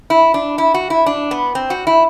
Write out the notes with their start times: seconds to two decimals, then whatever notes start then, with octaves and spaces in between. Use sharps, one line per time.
0.10 E4
0.34 D4
0.58 E4
0.74 F#4
0.90 E4
1.06 D4
1.31 B3
1.55 C4
1.70 F#4
1.87 E4